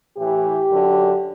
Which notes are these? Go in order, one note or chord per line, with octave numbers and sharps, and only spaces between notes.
A2 E3 G4
F#2 D3